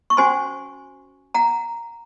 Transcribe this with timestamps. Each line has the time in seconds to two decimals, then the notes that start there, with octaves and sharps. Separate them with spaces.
0.10 C#6
0.17 C#4 F#4 C5 G#5 C6
1.34 F#5 A#5